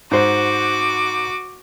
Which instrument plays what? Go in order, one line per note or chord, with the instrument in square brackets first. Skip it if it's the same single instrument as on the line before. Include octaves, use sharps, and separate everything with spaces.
[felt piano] G#2 C5 [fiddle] F#4 D6